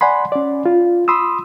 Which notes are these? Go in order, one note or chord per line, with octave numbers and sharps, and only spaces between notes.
D5 F#5 G#5 B5 C6
C#4 D5
F4
B5 C6 D#6 E6